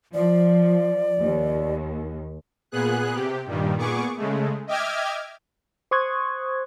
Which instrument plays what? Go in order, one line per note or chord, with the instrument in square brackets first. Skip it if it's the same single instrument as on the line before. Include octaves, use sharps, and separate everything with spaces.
[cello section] F3 [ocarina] D5
[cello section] D#2
[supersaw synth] A#2 B3 G#4 F#6
C3 G4
G2 A#2 D#3 G3
A#2 B3 G#4 C#6 D6
C#3 G#3 A3
D#5 E5 G5 D6 F6 G#6
[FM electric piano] C5 C6 C#6 D#6 F#6 G#6